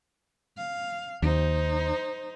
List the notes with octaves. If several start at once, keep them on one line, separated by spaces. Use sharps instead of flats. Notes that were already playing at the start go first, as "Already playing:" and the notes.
F5
D#2 D#4 C5